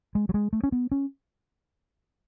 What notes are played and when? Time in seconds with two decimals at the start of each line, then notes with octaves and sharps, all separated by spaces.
0.15 G#3
0.29 F#3
0.34 G#3
0.53 A3
0.63 C#4
0.72 B3
0.91 C#4